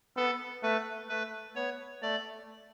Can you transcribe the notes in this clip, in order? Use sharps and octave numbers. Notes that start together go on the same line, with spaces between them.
B3 A4
A3 B4
A3 B4
B3 C#5
A3 D5